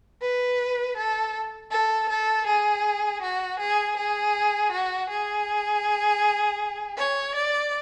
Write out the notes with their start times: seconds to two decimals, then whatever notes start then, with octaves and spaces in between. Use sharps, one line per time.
0.22 B4
0.97 A4
1.71 A4
2.09 A4
2.47 G#4
3.22 F#4
3.59 G#4
3.97 G#4
4.72 F#4
5.10 G#4
6.97 C#5
7.35 D5